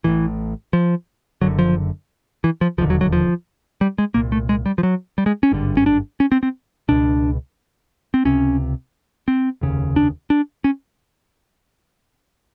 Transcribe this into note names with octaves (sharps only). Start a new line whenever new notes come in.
A1 A2 E3
F3
F#1 F#2 D3 F#3
F3
E3
F3
E1 D#2 D3 F3
F#3
F#3
F3
G3
G#3
C2 A#2 A#3
A3
G#3
G3
F3
F#3
G3
G#3
C#4
G#1 G2 D3
C#4
D4
C#4
C4
C4
C#2 B2 D4
C4
C#2 C3 C#4
C4
F1 D#2 C#3
D4
D4
C#4